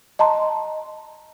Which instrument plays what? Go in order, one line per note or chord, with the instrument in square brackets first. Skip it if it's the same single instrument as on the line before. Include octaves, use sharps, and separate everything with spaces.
[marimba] D#5 A5 A#5 C6